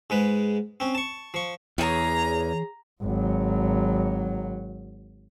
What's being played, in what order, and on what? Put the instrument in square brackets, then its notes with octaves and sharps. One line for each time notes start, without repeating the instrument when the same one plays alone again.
[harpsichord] G#2 G#3 B4
C4 C#4
A5 C#6
F3 C#6
[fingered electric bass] E2 [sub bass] E3 [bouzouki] G#4 C#5 [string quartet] A#5
[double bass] G#1 F#3